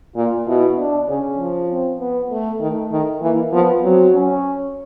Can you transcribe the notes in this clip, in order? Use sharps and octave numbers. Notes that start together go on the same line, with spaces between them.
A#2 F4
B2 E4
D4
C#3 C#4
F3
C4
B3
A3
D#3 A3
D#3
E3 A#3
F3 B3
F#3 C4
C#4